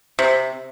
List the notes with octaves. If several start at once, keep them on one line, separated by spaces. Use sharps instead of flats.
C3